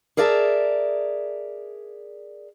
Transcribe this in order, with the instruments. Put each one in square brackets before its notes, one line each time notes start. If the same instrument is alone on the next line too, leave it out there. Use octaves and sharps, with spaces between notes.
[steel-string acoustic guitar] G#4 A#4 D5 E5 A5